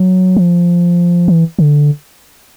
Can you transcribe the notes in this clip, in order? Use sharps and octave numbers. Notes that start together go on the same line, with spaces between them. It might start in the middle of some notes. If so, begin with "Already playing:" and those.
Already playing: F#3
F3
E3
D3